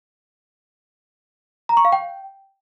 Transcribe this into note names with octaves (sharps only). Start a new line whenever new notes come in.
A#5
C#6
F5
G5